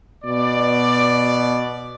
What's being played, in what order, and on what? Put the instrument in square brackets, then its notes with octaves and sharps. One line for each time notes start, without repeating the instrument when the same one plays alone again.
[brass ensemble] B2 D5